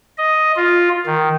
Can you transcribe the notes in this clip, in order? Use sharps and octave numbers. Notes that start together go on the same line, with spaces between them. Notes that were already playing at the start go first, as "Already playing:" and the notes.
D#5
F4
D#3